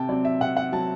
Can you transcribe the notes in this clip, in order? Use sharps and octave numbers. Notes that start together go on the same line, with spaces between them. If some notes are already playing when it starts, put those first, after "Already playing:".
Already playing: C3 G5 A5
F#3 C4 D5
E5
C3 F#5
F#5
F#3 C4 A5